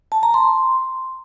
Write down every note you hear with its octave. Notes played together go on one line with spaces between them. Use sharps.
A5
A#5
C6